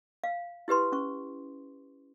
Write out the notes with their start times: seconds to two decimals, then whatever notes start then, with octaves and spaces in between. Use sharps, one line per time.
0.24 F5
0.68 E4 G4 B4 C6
0.92 C#4 C#6